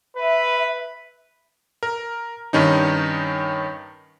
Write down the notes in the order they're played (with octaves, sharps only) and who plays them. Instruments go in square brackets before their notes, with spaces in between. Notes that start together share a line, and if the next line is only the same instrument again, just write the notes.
[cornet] B4 [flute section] E5
[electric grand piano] A#4
G2 D#3 C#4 D#4